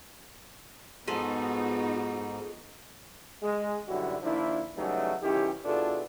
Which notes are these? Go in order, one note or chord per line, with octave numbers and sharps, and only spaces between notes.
G#2 F3 B3 D#4 F#4 G#4 A4
G#3
B1 F#2 D3 G3 E4 F#4
D#3 F3 A#3 D4 E4
C#3 E3 F#3 G3 A3 D#4
B1 D#3 C#4 E4 G4
B2 D4 E4 F4 G#4 A4